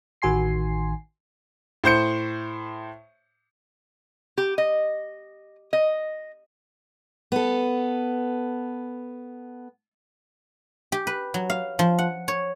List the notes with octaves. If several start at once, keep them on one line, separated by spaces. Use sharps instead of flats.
A1 D#3 F#4 G#5 C6 C7
A2 C5 G6 C#7
G4
D#5
D#5
B3 A4
G4
B4
F#3
F5
F3
F#5
C#5